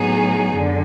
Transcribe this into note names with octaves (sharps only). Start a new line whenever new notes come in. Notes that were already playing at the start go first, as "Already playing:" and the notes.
Already playing: A2 F#3 B3 D#4 G#4
F#2 D3